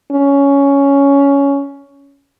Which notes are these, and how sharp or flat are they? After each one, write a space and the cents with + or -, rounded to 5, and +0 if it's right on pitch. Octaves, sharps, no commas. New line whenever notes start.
C#4 +10